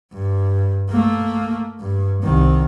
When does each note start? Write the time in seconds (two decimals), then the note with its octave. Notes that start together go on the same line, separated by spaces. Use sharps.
0.13 G2
0.89 A3 A#3
1.80 G2
2.23 C2 D#3